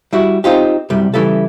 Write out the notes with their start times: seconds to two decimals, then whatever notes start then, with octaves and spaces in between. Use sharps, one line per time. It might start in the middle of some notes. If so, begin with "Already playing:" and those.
0.13 G3 E4 F#4
0.44 C4 D#4 F4 G4
0.90 C2 F#2 G3
1.14 C#3 E3 G3 A3 A4